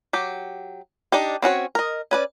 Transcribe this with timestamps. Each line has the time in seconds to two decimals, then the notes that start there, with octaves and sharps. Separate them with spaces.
0.13 F#3 G4
1.12 D4 D#4 G4
1.42 C4 C#4 F#4 C#5
1.75 A#4 D#5
2.11 C#4 B4 D5